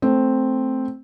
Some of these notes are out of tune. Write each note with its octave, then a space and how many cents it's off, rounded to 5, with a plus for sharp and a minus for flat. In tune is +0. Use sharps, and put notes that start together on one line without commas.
A3 +0 C4 +0